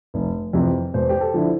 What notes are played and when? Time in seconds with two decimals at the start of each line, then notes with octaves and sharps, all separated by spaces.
0.14 F1
0.53 F2 C3 E3
0.94 E1 C5
1.09 G4
1.21 A4
1.34 D3 F3 E4